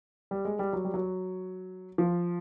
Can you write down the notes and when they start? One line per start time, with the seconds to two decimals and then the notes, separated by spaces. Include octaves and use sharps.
0.31 G3
0.45 G#3
0.59 G3
0.73 F#3
0.84 G3
0.94 F#3
1.98 F3